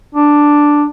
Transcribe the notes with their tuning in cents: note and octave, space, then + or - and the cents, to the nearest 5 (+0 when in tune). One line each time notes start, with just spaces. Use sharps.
D4 +0